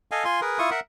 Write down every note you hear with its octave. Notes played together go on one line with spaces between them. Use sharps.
A4 D#5 F5 G#5
F4 G#5 C6
G#4 A#4 B4
E4 F4 C#6 D#6
A#4 E5 F#5